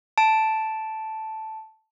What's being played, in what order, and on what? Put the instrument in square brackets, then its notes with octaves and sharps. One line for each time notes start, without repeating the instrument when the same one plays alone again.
[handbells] A5 D7